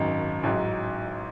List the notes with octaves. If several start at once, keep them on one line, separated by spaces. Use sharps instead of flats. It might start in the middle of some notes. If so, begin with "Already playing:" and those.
Already playing: G#1 F#2 D#3
A1 G#2 F#3